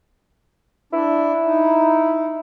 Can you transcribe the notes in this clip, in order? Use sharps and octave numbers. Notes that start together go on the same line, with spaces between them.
D4 E4
D#4